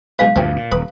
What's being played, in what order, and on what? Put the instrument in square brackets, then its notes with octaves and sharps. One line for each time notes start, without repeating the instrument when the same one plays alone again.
[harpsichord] B1 G#3 B4 [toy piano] F5
[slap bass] D2 G2 A#2 [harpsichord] F3 A3 C4
[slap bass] A#2
[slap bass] D#1 [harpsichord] B4 B5 D#6